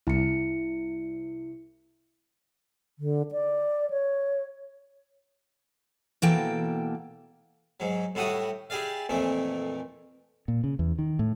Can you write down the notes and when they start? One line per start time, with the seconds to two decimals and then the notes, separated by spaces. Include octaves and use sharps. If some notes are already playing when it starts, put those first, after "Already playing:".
0.07 C2 E4 C#7
2.99 D3
3.32 D5
3.90 C#5
6.22 B2 E3 A#3 A4 G5
7.80 G#2 F#3
8.15 A2 G3 E4 F#4 F#5 D#6
8.70 E4 G4 G#4 D5 F5
9.09 F2 A#2 E3 A3
10.48 A#2
10.64 C#3
10.79 E2
10.99 D#3
11.19 A2